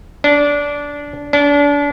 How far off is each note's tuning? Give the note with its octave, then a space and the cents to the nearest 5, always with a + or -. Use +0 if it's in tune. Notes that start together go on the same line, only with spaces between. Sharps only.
D4 -15
D4 -30